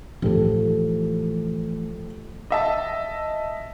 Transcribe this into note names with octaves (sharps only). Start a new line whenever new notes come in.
A2 E3 F3 G4 A4
D#5 E5 A5